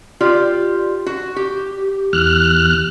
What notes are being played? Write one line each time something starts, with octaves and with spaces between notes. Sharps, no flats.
F4 G4 D5
F#4
G4
E2 F6 F#6